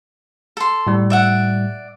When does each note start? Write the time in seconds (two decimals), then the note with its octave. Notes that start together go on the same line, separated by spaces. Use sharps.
0.57 A4 C6
0.87 A2 G3
1.10 D5 E5 F#5